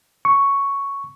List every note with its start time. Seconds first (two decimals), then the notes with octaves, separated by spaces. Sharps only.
0.25 C#6